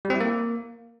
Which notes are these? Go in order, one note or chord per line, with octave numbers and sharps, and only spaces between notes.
G3
C4
E4
A#3